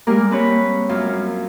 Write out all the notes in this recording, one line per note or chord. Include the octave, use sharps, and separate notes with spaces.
G3 G#3 A#3 A#4
C4 B4 C#5
F#2 A#3 F4